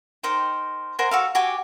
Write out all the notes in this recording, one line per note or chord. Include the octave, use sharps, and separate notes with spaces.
D#4 A#4 C5 G5
A#4 C5 F#5 G#5
F#4 A4 F5
F#4 G4 G#5 D6